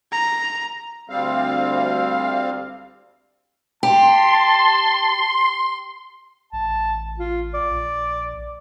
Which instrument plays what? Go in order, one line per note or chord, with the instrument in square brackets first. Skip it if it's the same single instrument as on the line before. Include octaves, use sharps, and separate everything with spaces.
[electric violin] A#5
[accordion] D2 G3 C4 F5
[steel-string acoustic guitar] G4 [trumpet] A5 [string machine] C6
[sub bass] A1 [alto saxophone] A5
[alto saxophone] F4
D5
[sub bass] A#1